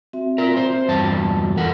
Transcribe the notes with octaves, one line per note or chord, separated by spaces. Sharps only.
C4 F#4 E5
F4 A#4
C5
E2 G2 F#4 A5
F2 A4 A#4 F#5